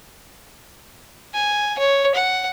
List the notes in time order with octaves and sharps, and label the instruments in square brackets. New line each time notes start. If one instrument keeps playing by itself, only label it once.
[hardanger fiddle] G#5
C#5
F#5